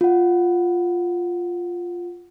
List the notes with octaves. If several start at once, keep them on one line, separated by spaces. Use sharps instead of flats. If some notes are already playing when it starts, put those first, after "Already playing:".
F4 F#5